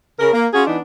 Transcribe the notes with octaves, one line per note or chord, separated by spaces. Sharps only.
C#3 A#4
A#3
C#4 F4 F#4 G#4
E3 B3 D4 D#4